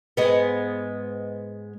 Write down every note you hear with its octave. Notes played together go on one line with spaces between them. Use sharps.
G#2 G#3 B3